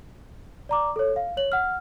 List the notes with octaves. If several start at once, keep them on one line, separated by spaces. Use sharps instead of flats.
D5 A#5 D6
A4 C#5
F5
C#5 F#7
F#5 F6